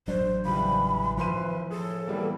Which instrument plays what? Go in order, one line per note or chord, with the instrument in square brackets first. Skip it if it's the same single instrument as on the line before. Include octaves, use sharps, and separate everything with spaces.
[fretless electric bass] A1 F#3 D4 [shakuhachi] C5
[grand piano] C#2 G3 [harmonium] E3 [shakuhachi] B5
[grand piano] G#1 C6 D#7 [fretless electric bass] F3 [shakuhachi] B4
[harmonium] A2 [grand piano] G#4 [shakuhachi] A4
[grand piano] E3 G3 A#3 [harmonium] B3